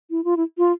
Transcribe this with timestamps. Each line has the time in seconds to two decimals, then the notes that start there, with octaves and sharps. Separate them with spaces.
0.11 E4
0.24 F4
0.37 E4
0.58 F4